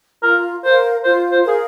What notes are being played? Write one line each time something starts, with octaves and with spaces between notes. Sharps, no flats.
F4 A#4
A#4 C5 F5
F4 C5
C5
G#4 A#4 F5